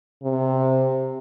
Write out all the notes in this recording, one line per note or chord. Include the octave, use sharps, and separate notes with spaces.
C3